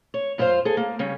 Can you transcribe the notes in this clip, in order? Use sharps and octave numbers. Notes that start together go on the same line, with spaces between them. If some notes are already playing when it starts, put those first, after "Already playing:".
C#5
F#2 E4 F4 G#4 C5 F5
G#4 A4
A#3
C#3 G3 C#4